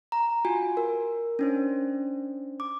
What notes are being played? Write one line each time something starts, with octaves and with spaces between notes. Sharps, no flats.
A#5
F4 F#4 G#5
A#4
C#4 D4 C5
D6